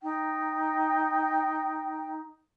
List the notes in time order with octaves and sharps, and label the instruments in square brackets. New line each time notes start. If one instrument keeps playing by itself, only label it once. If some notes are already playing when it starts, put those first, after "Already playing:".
[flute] D#4 [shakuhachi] G5